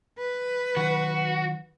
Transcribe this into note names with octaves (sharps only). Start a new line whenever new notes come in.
B4
D#3 F#3 F#4